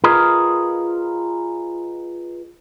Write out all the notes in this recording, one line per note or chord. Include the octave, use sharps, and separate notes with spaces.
F4 G#4 A#4 B4 D#5